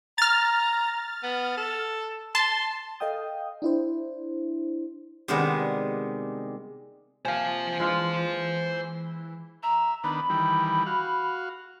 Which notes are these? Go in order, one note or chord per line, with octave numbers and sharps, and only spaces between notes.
A#5 F6 A6
B3
A4
A5 C6
A4 D#5 F5 G5 D#6
D4 E4 C5
C3 D#3 G3 G#3 B3 D4
C3 A#3 C5 F5 G#5
E3 G#3 D4 F4
E5 A#5
D#3 B3 D4 B5
D#3 E3 G3
F#4 F5